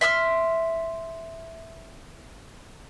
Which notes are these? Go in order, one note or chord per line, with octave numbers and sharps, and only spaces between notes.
E5 C6 E6 F6